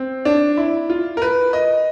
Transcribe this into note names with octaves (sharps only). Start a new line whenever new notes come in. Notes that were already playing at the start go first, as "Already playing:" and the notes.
Already playing: C4
D4
E4
F4
A#4
B4
D#5